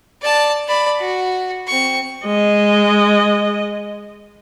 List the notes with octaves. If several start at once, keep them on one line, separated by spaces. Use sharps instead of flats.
D5 A5
D5 B5
F#4
C4 C#6
G#3 D#5